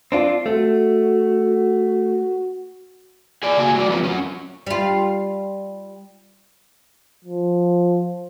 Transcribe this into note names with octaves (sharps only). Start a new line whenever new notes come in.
C4 D4 F4
A3 F#4
G#4 D5
C#3 A#3 F#4 G#5
F#3 G#3 F#4 D5
F3 G3 A3 B3 C4 F4
F#3 C#4
G3 F4
F3